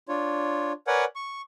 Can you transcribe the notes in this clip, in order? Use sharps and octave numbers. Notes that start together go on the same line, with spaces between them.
D4 F4 C#5
A#4 B4 C#5 D5 F#5 G#5
C#6